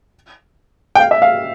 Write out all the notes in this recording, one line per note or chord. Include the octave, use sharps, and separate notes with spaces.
G5
F5
E5
F5